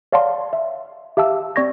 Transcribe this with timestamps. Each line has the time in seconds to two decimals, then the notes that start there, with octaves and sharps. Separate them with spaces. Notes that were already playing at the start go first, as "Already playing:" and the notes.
0.12 C#5 D5 F5 F#5 A5 C6
0.53 E5
1.17 G4 E5 F5 A5 E6
1.56 C4 D5 C#6 G#6 A#6